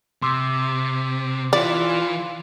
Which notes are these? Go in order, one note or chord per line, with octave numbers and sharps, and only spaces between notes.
C3 C6 D6 E6
E3 F4 D5